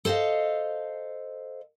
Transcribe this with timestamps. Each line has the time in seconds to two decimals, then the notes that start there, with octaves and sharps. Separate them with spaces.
0.05 A4 C5 D5 D#5 F5